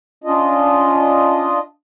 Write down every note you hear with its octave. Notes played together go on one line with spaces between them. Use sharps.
C#4 D4 F4 D#5